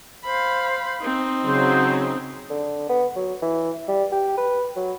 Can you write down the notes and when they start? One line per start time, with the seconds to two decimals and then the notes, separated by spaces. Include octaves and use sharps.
0.24 C5 F5 B5
1.01 C4 D#4
1.44 C#3 F#3 C5
2.50 D3
2.89 B3
3.16 F#3
3.42 E3
3.88 G3
4.12 G4
4.37 B4
4.76 F#3